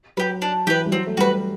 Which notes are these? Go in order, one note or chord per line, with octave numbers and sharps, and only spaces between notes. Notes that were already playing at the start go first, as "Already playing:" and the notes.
F#3 G4 B4
D4
E3 G4 B4
G3
F#3 C4
A3
G3 F#4 B4